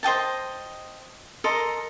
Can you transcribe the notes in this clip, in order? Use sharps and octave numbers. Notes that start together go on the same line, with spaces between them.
C5 D#5 G5 A5
A4 A#4 D#5 C6